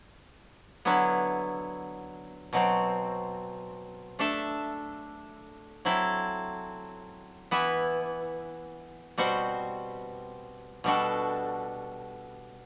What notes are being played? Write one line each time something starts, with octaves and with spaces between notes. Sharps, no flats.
D3 F#3 B3 E4
B2 F#3 C4
A3 D4 A4 E5
F#3 C4 E4 A4
E3 B3 E4 B4
B2 G3 C4 F#4 C5
B2 G3 D4 F#4 A4